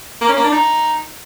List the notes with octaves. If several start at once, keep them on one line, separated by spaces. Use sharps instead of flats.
A#3
C#4
A#3
D4
D#4